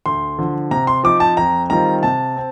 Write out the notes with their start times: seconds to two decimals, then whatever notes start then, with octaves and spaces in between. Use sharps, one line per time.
0.06 D2 C6
0.38 D3 F3
0.71 C3 A#5
0.87 C6
1.04 F3 C4 D#4 D6
1.20 A5
1.37 F2 A#5
1.70 D#3 G3 C4 F4 A#5
2.03 C3 A5
2.36 C4